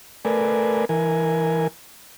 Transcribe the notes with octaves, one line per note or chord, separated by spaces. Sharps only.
A3 A#4 B4 D5 G#5
E3 A#4 G#5